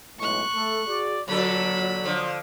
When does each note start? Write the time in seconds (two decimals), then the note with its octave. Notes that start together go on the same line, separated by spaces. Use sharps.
0.19 B1 A2 G#3 C#6 F#6
0.55 A3 A4
0.87 F#4 G#4 D5
1.28 A#2 D3 F#3 A4 B5
2.04 D3 F3